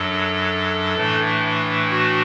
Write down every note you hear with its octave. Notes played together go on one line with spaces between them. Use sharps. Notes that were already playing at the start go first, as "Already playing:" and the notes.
Already playing: F#2 F#3 D4 A4
A2 E3 A3 D4
F#4